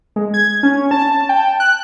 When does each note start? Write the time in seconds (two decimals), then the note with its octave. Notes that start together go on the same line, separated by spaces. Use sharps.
0.16 G#3
0.34 G#6
0.63 C#4
0.91 A5
1.29 G5
1.60 F#6